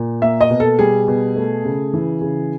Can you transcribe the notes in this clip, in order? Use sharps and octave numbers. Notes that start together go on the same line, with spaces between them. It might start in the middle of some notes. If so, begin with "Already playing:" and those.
Already playing: A#2
A#3 E5
D#5
B2
A4
G3 G#4
B2
A3
C#3
E3
C#3